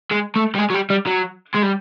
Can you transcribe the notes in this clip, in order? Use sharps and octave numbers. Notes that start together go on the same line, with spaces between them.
G#3
A3
G3
G#3
F#3
G3
G3
F#3
G#3
G3